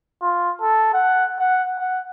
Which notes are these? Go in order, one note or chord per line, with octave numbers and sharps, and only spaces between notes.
F4
A4
F#5
F#5
F#5